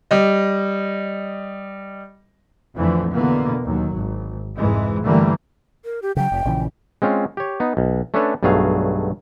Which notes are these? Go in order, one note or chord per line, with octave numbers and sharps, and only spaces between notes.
G3 D#5
F2 D3 E3 F3 A3
B2 D3 E3 A#3 B3
D#2 F#3
G#1
C2 F2 G#2 E3 G#3
G2 D3 E3 G3 A3 A#3
A#4
G4
C#3 F#3 G5
F1
A#1 C#3 E3
G#3 C4 C#4 F4
G4 C#5
B3 D#4
B1
A3 C#4 D4 A4 B4 C#5
B1 G2 F#3 A3 G#4 F5